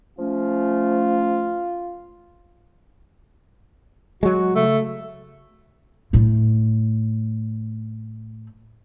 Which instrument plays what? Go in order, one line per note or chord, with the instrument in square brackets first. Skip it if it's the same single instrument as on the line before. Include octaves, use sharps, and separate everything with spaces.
[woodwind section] F3 A3 C#4 [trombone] F4
[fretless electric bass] F#3 G#3 [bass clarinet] F#4
[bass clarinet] C#3 [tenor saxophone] A3
[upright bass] A2 A3